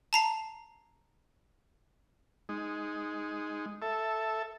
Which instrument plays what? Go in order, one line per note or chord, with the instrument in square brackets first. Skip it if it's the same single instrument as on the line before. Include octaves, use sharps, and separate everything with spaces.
[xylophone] A5 A#5 C7
[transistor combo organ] G#3 D#4
A4 E5